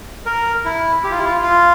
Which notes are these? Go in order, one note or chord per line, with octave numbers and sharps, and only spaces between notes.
A#4
E4
G4
F4
E4
F4
F4